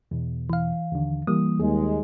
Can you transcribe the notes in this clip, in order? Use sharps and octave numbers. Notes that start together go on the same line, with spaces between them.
E2 B2
E3 F5
D#2 D3
E3 G3 A#3 D#6
D#2 G#3 G#4